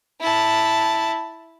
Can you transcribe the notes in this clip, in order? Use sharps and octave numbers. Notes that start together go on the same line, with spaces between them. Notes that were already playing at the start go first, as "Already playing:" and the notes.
E4 A5